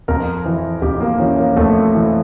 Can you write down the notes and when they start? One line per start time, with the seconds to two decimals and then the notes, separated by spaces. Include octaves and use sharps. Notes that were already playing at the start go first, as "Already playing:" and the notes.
0.08 F2 A#4
0.45 E3
0.82 F2 G4
1.01 A#3
1.19 E3 C#4
1.39 A#3
1.56 F2 A3
1.94 E3